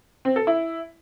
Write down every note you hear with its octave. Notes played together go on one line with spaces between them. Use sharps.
C4
A4
E4